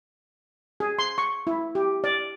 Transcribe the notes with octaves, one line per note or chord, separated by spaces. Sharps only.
G#4
C6
C#6
E4
G4
D5